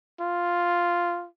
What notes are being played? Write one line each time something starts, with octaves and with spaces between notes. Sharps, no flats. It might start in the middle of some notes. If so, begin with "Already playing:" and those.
F4